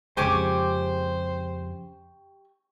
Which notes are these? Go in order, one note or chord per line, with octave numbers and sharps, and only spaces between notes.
F2 C#3 G#3 G4 C5 G#5 C#6 D6